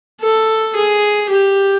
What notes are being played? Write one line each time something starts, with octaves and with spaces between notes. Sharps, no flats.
A4
G#4
G4